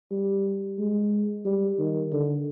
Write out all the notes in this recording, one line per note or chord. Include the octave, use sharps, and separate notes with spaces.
G3
G#3
G3
D#3
D3